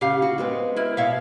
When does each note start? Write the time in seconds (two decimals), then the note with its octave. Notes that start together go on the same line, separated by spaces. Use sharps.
0.01 C#3 G4 F5
0.22 F#4
0.38 G#3 B3 C4
0.76 E4 A#4
0.97 B2 C#5 E5 F5